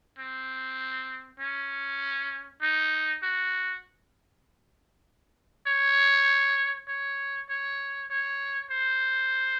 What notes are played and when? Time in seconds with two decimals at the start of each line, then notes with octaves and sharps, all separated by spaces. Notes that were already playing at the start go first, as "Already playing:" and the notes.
0.18 C4
1.40 C#4
2.62 D#4
3.23 F#4
5.67 C#5
6.88 C#5
7.50 C#5
8.10 C#5
8.71 C5